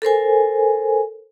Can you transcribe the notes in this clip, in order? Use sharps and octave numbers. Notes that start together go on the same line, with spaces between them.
A4 A#4 C5 G#5